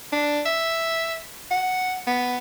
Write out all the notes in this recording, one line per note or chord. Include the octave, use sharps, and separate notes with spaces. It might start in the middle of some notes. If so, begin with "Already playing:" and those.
D4
E5
F#5
B3